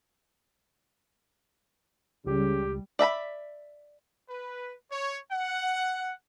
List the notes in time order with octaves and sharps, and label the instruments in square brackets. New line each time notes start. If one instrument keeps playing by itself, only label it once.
[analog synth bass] C#2 [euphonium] C#3 [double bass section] G3 [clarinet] G4
[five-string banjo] D5 E5 A#5 B5
[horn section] B4
C#5
F#5